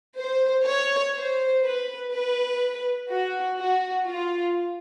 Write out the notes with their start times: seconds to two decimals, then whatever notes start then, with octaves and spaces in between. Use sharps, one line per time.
0.18 C5
0.66 C#5
1.16 C5
1.64 B4
2.12 B4
3.10 F#4
3.58 F#4
4.07 F4